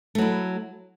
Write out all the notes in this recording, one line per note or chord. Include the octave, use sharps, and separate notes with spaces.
F#3 A3 E4